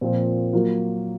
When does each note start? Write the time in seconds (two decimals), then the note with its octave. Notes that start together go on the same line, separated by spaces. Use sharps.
0.01 A#2 F3 C4
0.53 F#3 A#3 F4